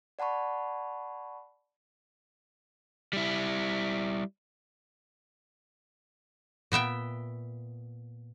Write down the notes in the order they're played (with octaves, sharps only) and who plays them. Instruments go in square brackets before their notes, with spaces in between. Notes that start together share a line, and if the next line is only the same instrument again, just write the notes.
[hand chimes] D5 F#5 A5 B5 C#6
[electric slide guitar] G3 E4
[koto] A#2 B3 E5 G5